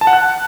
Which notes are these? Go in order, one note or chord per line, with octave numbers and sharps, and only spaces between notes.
A5
F#5
F#6